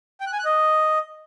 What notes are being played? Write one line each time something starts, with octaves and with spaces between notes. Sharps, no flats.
G5
F#6
G#5
F#6
D#5